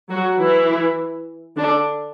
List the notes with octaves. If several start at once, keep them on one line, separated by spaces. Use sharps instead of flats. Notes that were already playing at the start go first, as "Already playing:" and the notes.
F#3 F#4
E3 E4
D3 D4